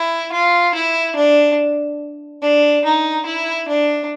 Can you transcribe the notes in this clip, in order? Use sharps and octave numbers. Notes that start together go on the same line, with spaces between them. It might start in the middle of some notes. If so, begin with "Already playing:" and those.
Already playing: E4
F4
E4
D4
D4
D#4
E4
D4